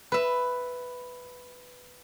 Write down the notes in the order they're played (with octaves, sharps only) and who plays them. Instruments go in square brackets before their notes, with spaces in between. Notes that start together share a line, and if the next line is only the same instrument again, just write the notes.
[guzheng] B4 E5